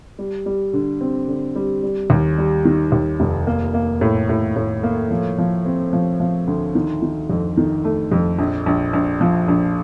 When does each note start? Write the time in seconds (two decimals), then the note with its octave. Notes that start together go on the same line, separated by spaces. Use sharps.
0.19 G3
0.46 G3
0.73 D3
1.01 C4
1.28 D3
1.55 G3
1.83 G3
2.10 D#2
2.38 G3
2.65 D#3
2.92 D#2
3.20 F1
3.47 A#3
3.74 A#3
4.01 A2
4.29 A2
4.56 A2
4.83 A#3
5.11 F3
5.38 F3
5.65 C4
5.93 F3
6.20 F3
6.47 D2
6.75 D#3
7.02 D#3
7.29 F2
7.57 D#3
7.85 A3
8.12 F2
8.39 A#1
8.66 A#1
8.93 A#1
9.21 F3
9.48 A#1